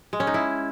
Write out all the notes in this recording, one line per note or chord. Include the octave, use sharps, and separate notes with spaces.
G#3
C#4
D#4
E4